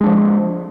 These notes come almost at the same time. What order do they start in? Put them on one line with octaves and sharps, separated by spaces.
G#3 D4 F3